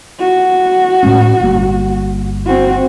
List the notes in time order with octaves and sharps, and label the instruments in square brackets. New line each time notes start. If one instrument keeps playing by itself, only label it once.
[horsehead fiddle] F#4
[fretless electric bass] A2 G#3 C#4
G1 G2 A#3
[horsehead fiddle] C4 F#4